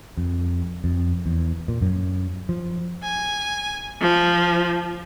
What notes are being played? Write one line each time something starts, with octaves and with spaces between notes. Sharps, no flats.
F2
F2
E2
A#2
F#2
F3
G#5
F3